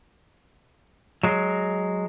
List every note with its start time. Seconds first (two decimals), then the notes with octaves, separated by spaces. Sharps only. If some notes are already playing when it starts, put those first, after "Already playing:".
1.23 F#3 G#3